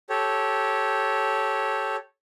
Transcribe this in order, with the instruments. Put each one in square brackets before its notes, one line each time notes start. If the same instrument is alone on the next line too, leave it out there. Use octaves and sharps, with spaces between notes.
[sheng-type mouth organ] G4 A4 C#5